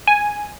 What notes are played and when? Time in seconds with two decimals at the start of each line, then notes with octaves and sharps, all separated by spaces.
0.07 G#5